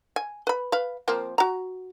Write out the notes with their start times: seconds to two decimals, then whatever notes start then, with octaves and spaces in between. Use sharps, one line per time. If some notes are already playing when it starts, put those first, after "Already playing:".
0.16 G#5
0.47 B4 B5
0.72 B4 F5
1.08 F3 A#3 C4
1.38 F#4 A#5